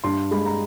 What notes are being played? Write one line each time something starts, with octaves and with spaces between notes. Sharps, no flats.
G2 C6
G#3 B5
A#5